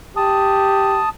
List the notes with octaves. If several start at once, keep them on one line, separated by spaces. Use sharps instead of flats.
G4 A5 D#6